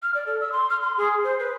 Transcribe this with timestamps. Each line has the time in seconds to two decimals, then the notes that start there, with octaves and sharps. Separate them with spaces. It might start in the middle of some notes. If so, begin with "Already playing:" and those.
0.02 F6
0.14 D5
0.26 A4
0.41 E6
0.52 C6
0.70 F6
0.82 C6
0.97 G#4
1.24 C5
1.39 B4